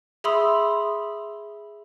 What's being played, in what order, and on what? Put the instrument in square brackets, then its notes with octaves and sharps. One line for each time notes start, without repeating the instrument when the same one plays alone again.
[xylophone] G#4 E5 B5 C6 D#6 E6